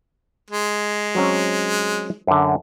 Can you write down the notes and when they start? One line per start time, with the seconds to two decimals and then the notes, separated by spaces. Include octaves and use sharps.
0.51 G#3
1.15 F#3 C4 C#4
2.27 F#2 D3